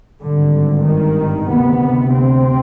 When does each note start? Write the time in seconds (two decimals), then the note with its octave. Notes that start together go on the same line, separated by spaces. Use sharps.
0.21 G#1 G2 D3
0.85 D#3
1.50 D2 C3 B3
2.15 C4